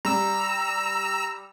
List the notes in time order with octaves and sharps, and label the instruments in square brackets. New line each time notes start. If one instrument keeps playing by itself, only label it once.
[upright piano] G3 [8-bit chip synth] A#5 E6